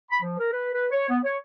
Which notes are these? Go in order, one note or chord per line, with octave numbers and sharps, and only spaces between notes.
B5
F3
A#4
B4
B4
C#5
B3
C#5